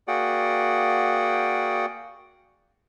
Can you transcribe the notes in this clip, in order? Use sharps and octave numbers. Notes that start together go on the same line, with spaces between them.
A#3 F#4 G#4 D5 F#5 G5